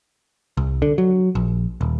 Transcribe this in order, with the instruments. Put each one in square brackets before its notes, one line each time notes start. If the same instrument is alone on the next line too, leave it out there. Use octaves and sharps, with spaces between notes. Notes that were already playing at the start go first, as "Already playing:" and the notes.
[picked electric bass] C2
D3
F#3
A#1
D#1